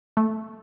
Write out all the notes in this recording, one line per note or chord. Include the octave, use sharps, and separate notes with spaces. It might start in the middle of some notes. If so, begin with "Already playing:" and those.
A3